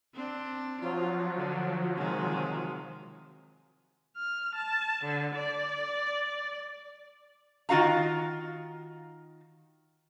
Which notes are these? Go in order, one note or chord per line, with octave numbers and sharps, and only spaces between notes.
C4 D4
F3 F#3 F4
D3
C3 D#3 G#3
F6
A5
D3
D5
D#3 F4 F#4 F5 A#5